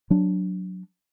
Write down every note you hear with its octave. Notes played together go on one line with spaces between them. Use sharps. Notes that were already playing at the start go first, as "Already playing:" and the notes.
F#3 D4